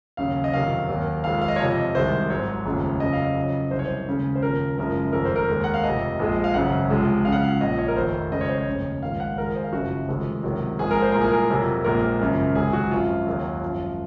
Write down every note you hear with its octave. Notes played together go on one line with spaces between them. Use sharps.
D#2 C#3 F#3 F5
D#5
F2 C3 D#3 F#3 F5
D#2 D#3 F#3
F2 D#3 G#3 F5
F5
D#5
C#5
F2 C3 F3 D#5
C2 C3 D#3 G#3 C5
G#1 G#2 F#3 C#5
F1 D#2 C#3 F3 G#3
F2 C#3 F#3 D#5
F5
D#5
F2 C#3 F#3
C2 C3 F#3 C5
C#5
C5
D#2 C#3 G#3
C5
D#2 C#3 F3 A#4
F#1 F#2 C#3 F3 G#3 A#4
F1 F2 D#3 G#3 A#4
C5
A#4
D#2 D#3 G#3
F#5
F5
F1 F2 C3 D#5
A#1 A#2 F3 G#3
F5
G#1 F#2 C#3 F#3 F#5
C#2 C3 F3 G#3
C#2 C#3 F#3 F5
F#5
F5
A#1 A#2 F3 D#5
C#5
A#4
F1 F2 D#3 C5
F2 C#3 G#3 D#5
C#5
C5
C#5
F1 D#2 C#3
A#1 G#2 D#3 F5
F#5
F2 D#3 G#3 A#4
G#4
C5
F5
F#1 F#2 C#3 F3 F#4
F1 F2 C3 D#3 G#3
C#2 C3 D#3 F#3
A#1 G#2 F3 G#3 G#4
A#4
C5
C2 A#2 F3 G#3 A#4
G#4
A#4
F2 C3 F#3
A#1 A#2 G#3 A#4
G#1 F#2 C#3 F3
C#2 C3 D#3 F#3 G#4
F#4
G#1 F#2 F3 F4
D#2 D#3 F#3
G#1 F#2 F3